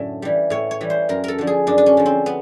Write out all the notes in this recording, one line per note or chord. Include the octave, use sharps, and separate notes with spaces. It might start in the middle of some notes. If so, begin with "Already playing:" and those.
Already playing: F#2 A2 D3 F#3
E3 G3
A2 C#5
C#5
E3 G3
C5
F#2 A#4
A4 A#4
D3 F3
G#4
F#2 D4
D4
C#4
D3 F3
C4
B3